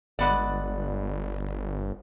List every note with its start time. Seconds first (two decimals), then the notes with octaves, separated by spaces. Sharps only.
0.19 G1 G#3 B3 D5